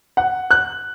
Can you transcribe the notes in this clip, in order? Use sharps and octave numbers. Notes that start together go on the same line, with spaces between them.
F#5
F#6